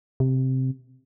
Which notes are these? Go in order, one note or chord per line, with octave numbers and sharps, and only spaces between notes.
C3